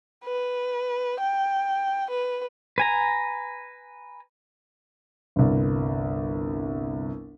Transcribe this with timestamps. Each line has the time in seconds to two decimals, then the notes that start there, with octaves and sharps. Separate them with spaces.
0.25 B4
1.20 G5
2.10 B4
2.78 B4 G#5 A#5
5.36 G1 C2